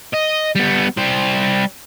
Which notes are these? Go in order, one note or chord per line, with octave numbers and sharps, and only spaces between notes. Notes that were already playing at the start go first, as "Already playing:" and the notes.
D#5
G3 B3
G3 C5